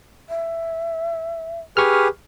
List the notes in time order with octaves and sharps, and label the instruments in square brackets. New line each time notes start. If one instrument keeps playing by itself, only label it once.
[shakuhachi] E5
[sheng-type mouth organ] G4 G#4 B4 [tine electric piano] C#6 F6